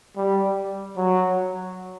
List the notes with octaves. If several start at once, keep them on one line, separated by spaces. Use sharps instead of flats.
G3
F#3